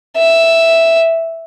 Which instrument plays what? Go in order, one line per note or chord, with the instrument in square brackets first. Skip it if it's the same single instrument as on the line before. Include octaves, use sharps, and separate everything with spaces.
[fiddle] E5